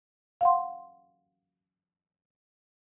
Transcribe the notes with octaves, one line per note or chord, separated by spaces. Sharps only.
F5 F#5 C6